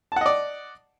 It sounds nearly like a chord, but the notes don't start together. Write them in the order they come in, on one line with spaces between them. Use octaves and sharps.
A5 F#5 D#5 D5